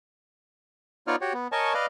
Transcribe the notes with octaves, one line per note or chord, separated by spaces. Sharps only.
B3 D#4 F4 C#5 D5 F6
F#4 G4 C#5
B3
A#4 C#5 D#5 G#5 A5 C#6
B4 D5 D#5 F5